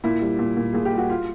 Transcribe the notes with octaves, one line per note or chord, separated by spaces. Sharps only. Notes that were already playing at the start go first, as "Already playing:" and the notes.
A#2 E4
G3
A#2
A#2
A#2 G#4
G4
G3 F#4
F4